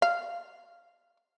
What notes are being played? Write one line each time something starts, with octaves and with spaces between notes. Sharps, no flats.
F5